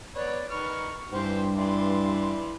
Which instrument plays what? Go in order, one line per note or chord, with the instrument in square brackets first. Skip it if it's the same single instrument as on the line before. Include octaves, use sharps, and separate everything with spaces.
[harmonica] B3 B4 C#5 [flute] D5
[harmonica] D#3 B4 F6 [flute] C#6
[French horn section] G2 [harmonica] E3 C4 G4 [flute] C5
[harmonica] E3 E4 D5 [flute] C6